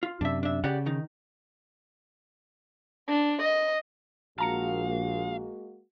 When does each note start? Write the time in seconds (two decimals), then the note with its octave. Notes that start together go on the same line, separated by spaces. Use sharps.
0.03 F4
0.21 F#2 C3 D4 E5
0.43 D4 E5
0.64 C#3 G4 D5 F#5
0.86 D#3 D#4
3.09 D4
3.42 D#5
4.39 A#1 G#3 A#3 F#4 F5 A5 A#5 C#7